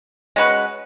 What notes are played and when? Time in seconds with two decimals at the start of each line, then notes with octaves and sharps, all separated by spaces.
0.36 G#3 C#4 F#4 B4